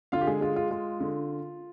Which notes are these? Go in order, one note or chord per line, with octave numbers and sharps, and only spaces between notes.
D3 F4 F5
G4
G#3 G#4
G#3 F4
F4
G#3 F4
D3